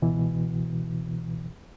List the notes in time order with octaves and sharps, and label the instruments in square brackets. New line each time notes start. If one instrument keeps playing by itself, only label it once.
[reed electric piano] C#2 B2 E3